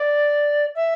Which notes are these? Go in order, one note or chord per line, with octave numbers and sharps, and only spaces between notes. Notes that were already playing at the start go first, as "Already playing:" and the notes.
Already playing: D5
E5